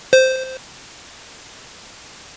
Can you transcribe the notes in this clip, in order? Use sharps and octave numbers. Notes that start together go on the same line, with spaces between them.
C5